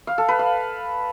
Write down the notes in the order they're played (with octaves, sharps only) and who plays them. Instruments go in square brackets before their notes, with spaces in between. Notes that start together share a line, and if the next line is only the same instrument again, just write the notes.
[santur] F5
A4
B4
F5